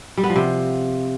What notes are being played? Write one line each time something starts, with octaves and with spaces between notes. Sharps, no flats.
G3
B3
F3
C3